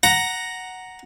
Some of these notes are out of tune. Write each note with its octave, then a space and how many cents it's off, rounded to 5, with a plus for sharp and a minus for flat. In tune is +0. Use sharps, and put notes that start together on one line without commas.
F#5 +0 A#5 +0